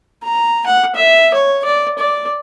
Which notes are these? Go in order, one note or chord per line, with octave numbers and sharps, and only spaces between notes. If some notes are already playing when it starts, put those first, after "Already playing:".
A#5
F#5
E5
C#5
D5
D5